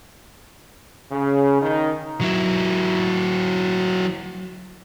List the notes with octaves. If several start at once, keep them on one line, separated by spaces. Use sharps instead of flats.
C#3
D#3
F#3 E4